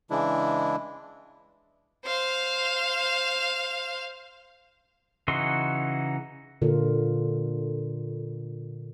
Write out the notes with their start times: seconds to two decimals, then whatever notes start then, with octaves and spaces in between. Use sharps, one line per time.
0.10 C#3 E3 G#3 D4 E4
2.05 C5 F5
5.28 C#3 E3 D#4 F#4 C6
6.62 A#2 D3 F4 A#4